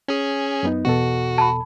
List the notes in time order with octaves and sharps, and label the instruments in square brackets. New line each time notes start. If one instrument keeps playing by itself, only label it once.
[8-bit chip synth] C#4 G#4
[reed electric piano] F#2 B3 D#4
[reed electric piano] E2 B2 A4 [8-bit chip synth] F#4
[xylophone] A5 B5